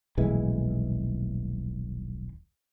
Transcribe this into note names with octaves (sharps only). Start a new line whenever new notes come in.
D#1 B1 E3 G#3